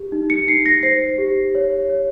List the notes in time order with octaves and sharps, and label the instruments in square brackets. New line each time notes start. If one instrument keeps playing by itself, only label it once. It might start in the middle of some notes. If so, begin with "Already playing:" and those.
Already playing: [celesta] G4
D#4
C#7
D#4 C7
A#6
C5 C7
G4
C#5
C#5